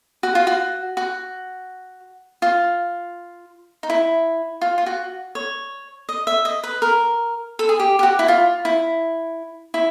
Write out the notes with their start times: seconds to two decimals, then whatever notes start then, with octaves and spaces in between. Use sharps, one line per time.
0.23 F#4
0.35 F4
0.47 F#4
0.97 F#4
2.42 F4
3.83 D#4
3.90 E4
4.61 F4
4.78 F4
4.86 F#4
5.35 C#5
6.09 D#5
6.27 E5
6.45 D#5
6.63 B4
6.82 A#4
7.59 A4
7.69 G#4
7.80 G4
7.99 G4
8.03 F#4
8.19 E4
8.28 F4
8.65 E4
9.74 E4